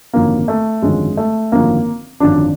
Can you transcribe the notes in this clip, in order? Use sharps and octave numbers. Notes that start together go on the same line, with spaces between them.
G#1 F#2 D3 F3 A#3
A3
G#1 F#2 D3 F3 G#3
A3
G#1 F#2 D3 F3 A#3
G#1 F#2 D3 F3 D4